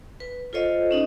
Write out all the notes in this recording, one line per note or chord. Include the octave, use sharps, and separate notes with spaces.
B4
F4 A4 C5 C#5 D#5 F5
C#4 D#4 D#5